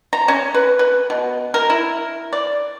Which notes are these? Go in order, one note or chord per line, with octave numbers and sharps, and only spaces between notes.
A#5
C#4
B4
B4
B2
A#4
E4
D5